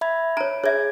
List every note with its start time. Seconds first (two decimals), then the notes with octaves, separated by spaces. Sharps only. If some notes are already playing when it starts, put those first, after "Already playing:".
0.01 E5 B5 G#6
0.37 C#5 A#5 D7
0.64 G#4 C#5 E5 G#6